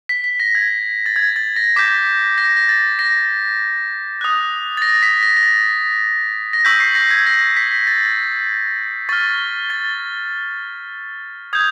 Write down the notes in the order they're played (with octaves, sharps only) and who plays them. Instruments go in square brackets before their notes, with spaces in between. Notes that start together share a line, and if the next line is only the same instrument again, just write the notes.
[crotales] B6
B6
A#6
G#6
A6
G#6
A6
A#6
D6 G6 B6
A#6
A#6
A6
A#6
D#6 F#6
A6
A#6
B6
A#6
A#6
A6
A#6
C#6 E6 G6 B6
C7
A#6
G#6
A#6
B6
A6
C#6 F6 A6
A6
D#6 G6 G#6